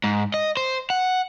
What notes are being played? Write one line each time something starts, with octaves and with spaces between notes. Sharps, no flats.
G#2
D#5
C5
F#5